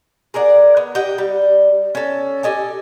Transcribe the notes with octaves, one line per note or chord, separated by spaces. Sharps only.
G#4 A#4 D5 F#5
B3
G4 D#5 F#5 G5
G3
C#4 A4
G4 A4 D#5 G#5